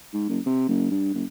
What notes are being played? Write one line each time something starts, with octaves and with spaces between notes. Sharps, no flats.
G#2
F#1
C3
F#1
G2
F#1